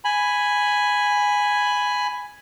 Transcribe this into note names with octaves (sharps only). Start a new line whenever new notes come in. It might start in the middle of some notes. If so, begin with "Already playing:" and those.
G#5 B5